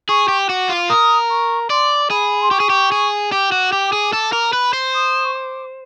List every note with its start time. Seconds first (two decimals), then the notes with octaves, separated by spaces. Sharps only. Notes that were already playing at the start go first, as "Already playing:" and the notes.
0.09 G#4 C#6
0.28 G4
0.48 F#4 D6
0.69 F4
0.89 A#4 D#6
1.30 C#6
1.70 D5 C6
2.11 G#4 B5
2.41 C6
2.51 G4 C#6
2.60 G#4
2.70 G4
2.92 G#4
3.32 G4 D6
3.52 F#4
3.72 G4
3.93 G#4
4.13 A4
4.33 A#4
4.53 B4
4.73 C5
4.94 D#6
5.24 C#6
5.34 D6